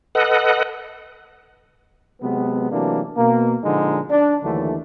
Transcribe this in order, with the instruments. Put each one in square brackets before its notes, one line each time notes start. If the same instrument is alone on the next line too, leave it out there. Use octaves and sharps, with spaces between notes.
[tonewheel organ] A4 B4 D#5 F#5
[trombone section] C3 F#3 G#3 B3
C3 E3 F#3 A3 A#3 D4
B2 A#3
A#2 D3 F3 G#3 D#4
D4
D#2 D3 E3 F#3 A3 D4